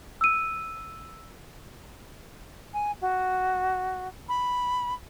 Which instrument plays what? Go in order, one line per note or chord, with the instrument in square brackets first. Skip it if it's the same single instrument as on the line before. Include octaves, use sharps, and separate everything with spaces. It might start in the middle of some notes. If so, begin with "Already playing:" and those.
[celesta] E6 D#7
[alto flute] G#5
F#4
B5